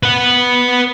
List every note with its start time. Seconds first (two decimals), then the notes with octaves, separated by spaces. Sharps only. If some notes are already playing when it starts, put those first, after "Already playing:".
0.03 B4 F#5